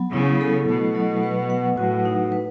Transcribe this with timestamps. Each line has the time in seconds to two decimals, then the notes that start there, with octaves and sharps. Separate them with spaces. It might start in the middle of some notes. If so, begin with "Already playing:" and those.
Already playing: F#3 B3
0.13 C#3 E4
0.41 A4
0.68 B2 A3
0.95 F#3
1.23 B4
1.50 F#5
1.77 A2 F#4
2.05 D#4
2.32 B4